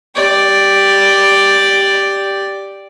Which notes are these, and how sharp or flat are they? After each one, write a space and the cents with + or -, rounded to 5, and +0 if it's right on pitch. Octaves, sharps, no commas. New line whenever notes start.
G4 +0 D5 +0